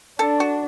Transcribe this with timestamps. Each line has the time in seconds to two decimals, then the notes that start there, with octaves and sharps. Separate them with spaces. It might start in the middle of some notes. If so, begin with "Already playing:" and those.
0.19 D4 A4
0.40 F#4